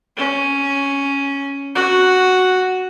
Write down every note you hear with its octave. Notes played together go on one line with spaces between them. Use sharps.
C#4
F#4